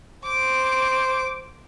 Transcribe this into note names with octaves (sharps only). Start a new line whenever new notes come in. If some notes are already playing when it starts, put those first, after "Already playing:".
C5 D6 D7